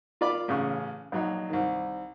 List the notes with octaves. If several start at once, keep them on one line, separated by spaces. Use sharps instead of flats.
F4 A#4 D5 F5 B5 D6
A1 C#3 G#4 F5 C#6
A#1 F#3 D#4
C2 D#3